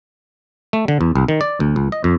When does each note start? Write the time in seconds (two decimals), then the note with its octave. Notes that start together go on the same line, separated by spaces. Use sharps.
0.73 A3
0.88 D3
1.01 E2
1.16 C2
1.28 D#3
1.41 D5
1.60 D2
1.76 C#2
1.92 D#5
2.04 F2